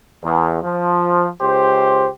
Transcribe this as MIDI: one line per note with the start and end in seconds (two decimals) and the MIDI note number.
0.23 0.58 40
0.63 1.27 53
1.41 2.08 37
1.41 2.08 67
1.41 2.08 72